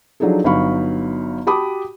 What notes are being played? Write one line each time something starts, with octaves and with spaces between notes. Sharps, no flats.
F3 F#3 D4 D#4 G#4 A4
G1 F#3 D#4 F5 B5 C#6
F#4 G4 A5 B5 D6 D#6